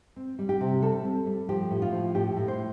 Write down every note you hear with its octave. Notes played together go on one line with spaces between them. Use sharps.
C4
G3
G4
C3
G3 A4
C4
G3
F3 G4
A2
F4
F3
A2 G4
A2
C5